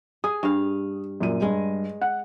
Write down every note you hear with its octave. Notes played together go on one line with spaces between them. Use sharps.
G#4 D#6
G2 F5
F#2 A#2 D#7
G2 G#3
F#5